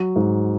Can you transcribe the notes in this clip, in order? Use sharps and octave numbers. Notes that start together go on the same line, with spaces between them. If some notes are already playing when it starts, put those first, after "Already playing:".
Already playing: F#3
G#2